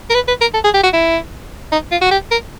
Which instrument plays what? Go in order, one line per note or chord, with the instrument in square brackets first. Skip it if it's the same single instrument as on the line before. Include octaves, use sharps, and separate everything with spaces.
[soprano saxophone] A#4
B4
B4
A#4
A4
G#4
G4
F#4
E4
D#4
F4
F#4
G4
A#4